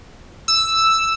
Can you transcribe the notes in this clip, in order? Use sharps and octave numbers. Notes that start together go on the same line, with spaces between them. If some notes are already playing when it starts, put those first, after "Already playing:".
E6